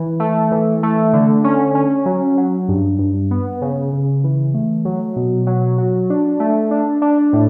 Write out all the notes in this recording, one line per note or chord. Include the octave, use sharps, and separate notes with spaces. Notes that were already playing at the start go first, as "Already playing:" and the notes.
Already playing: E3
A3
E3
A3
D3
C#4
C#4
F#3
F#3
G2
G2
B3
C#3
C#3
E3
A3
F#3
B2
F#3
F#4
D4
A3
D4
D4
A2